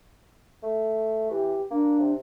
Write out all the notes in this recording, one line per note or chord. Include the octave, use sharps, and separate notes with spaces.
A3
E3 G4
A#3 D4
C3